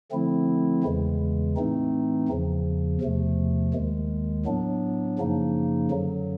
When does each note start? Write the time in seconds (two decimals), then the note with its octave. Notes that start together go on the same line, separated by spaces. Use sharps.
0.12 D3 F3 A3 C4 E4
0.84 E2 C#3 E3 G#3
1.56 A2 E3 A3 C4 D#4
2.28 E2 C#3 F3
3.01 E2 C3 F3 A3
3.74 D#2 D#3 G#3
4.46 A2 F#3 B3 D4
5.19 F#2 C#3 F3 A#3 D#4
5.91 F#2 D3 F#3